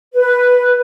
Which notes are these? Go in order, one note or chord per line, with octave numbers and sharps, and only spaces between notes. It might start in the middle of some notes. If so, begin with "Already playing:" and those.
B4